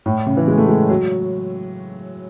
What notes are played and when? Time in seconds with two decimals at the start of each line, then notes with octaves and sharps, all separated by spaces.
0.06 A2
0.26 C#3
0.37 E3
0.48 G#3
0.58 A3
0.68 G#3
0.89 F#3